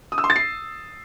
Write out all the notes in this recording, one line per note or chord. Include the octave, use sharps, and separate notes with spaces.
D#6
E6
C6
A6
C7